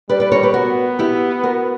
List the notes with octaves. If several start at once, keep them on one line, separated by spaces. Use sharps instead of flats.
G3 B4 D5
B4 D5
A#4 C#5
G4 B4
B3 F#4 A#4
E4 G4
F#4 A#4